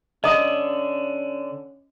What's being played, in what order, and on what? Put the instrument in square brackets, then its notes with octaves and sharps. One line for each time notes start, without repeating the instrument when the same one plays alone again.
[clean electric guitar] D3 [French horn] C#4 [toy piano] D#5 D#6